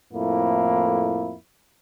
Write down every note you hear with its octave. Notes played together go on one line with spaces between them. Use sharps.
F2 A2 A#3 E4